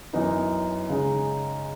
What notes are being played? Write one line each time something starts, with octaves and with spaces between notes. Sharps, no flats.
F#2 E3 B3 D#4
C#3 G#3 D#4